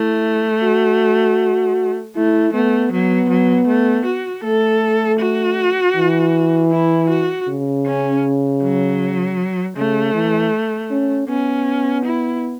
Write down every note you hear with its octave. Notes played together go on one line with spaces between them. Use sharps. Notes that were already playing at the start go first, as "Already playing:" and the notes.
Already playing: A3 E4
F#4
A3 E4
A3 B3
F#3 B3
F#3
A3
F#4
A3 A4
F#4
E3
E4
F#4
C#3
C#4
F#3
C#3 A3
E3
C#4
B3 C#4
E4